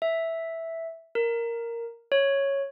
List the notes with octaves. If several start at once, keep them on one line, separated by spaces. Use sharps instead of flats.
E5
A#4
C#5